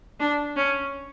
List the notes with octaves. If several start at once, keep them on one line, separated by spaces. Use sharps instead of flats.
D4
C#4